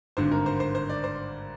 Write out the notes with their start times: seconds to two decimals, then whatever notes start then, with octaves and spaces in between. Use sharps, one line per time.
0.17 G#1 G2 D3 C5
0.31 A#4
0.46 C5
0.60 C5
0.75 C5
0.89 D5
1.04 C5